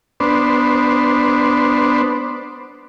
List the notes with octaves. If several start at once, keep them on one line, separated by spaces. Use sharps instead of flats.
B3 D4 C5